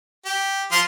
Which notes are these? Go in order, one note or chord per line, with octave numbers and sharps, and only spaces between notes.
G4
F3 F4 C6